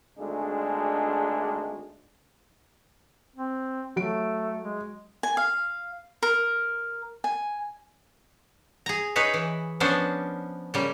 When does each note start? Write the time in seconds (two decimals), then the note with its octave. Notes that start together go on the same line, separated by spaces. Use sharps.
0.17 G#1 D2 G#3 A3 D4 G#4
3.36 C4
3.96 F#3 A3 D7
4.61 G#3
5.23 G#5
5.37 F5
6.23 A#4
7.24 G#5
8.86 G#4 A#5
9.16 D#4 G#4 B4 C#5 E5
9.34 E3
9.80 F3 B3 C#4 D4 C5
10.74 C#3 G3 A#3